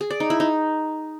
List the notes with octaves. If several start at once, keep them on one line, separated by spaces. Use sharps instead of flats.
G#4
D5
D#4
E4
D#4